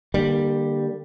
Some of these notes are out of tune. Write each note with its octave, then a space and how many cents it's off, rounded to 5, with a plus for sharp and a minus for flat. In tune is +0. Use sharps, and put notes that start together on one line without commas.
D3 +30 G3 +0 A#3 +0